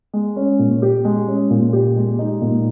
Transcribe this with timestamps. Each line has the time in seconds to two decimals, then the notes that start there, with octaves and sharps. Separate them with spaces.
0.13 G#3
0.36 C#4
0.59 A#2
0.82 G4
1.05 G#3
1.28 C#4
1.50 A#2
1.73 G4
1.96 G#3
2.19 D#4
2.41 A#2